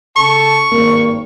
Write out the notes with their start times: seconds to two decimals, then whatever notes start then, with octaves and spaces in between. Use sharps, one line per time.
0.16 C#3 A4 A5 C#6
0.72 G#1 G2 A#3